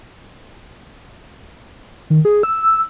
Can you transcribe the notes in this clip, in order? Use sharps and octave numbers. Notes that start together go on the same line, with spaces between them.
D#3
G#4
E6